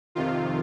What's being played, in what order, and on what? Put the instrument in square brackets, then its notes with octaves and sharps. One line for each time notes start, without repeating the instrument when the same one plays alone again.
[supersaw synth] F2 C3 D#3 F4